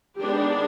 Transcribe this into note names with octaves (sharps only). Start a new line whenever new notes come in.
D#3 G#3 B3 D4 G4